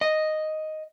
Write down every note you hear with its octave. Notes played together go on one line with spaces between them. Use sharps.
D#5